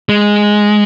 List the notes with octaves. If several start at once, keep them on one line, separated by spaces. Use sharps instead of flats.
G#3